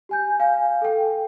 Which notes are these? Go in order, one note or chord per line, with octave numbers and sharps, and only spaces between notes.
G4 G#5 G6
F5 G#5
A4 G5